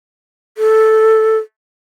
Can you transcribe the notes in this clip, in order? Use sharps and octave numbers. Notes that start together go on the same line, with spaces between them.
A4